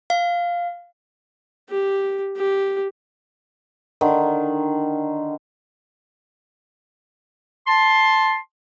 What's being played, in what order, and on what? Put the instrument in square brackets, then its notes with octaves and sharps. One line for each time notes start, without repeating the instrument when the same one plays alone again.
[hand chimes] F5
[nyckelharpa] G4
G4
[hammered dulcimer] D3 D#3
[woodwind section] A5 C6